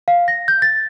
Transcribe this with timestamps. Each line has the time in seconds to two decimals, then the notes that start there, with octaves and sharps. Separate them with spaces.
0.08 F5
0.28 A#6
0.48 G6
0.62 A6